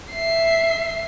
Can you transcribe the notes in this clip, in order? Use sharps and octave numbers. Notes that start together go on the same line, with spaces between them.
E5 C7